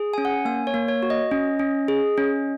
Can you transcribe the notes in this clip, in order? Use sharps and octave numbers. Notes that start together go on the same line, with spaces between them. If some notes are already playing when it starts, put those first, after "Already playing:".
Already playing: G#4
C#4 G#5
F#5
A#3 G#5
C#5
A#3
C#5
F#4
D#5
C#4
C#4
G#4
C#4